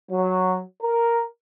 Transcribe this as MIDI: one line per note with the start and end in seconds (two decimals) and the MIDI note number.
0.12 0.59 54
0.82 1.22 70